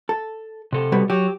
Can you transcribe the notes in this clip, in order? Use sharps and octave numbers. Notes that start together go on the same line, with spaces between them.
A4
C3 A4
B2 G3 B3
F#3 G4